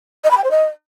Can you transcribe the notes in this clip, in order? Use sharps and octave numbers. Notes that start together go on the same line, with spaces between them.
D#5
B5
G5
C5
D#5